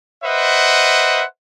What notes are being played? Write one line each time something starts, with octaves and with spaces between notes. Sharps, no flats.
B4 C5 D#5 E5 F#5